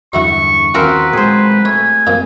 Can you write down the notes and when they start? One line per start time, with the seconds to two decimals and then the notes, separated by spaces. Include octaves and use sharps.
0.13 E2 G2 D3 F#3 E4 F#4 C#6
0.74 D#2 F3 C4 C#4 F4 F#4 A#4 B4
1.13 A#2 F#3 G#3 G#4 C5
1.65 A3 C#5 G#5
2.07 F#2 A#2 F3 C4